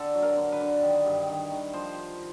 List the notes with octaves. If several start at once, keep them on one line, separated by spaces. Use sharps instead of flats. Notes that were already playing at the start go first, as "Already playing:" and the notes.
Already playing: D3 A4
F#3
A#4
D3
B4
D3
D#3
G2
D#3
D#3
F3 C5